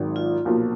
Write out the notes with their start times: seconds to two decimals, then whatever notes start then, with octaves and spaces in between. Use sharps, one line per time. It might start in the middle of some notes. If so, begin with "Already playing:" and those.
Already playing: G#1 G#2 D#3 F#3
0.16 F4
0.45 B1 A#2 F3 A#3 F4